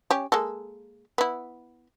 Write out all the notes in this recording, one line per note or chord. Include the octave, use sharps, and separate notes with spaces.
C#4 G4
G#3 A#3 A4
B3 E4